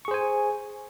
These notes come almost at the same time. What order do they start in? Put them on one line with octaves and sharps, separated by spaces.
C#6 G#4 C5 G#5